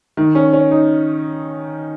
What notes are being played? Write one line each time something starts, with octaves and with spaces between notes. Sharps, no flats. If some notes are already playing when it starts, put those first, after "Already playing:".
D#3
C#4
C#4
D#4